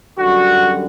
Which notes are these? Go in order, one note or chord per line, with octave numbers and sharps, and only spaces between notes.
F#2 D3 G3 F#4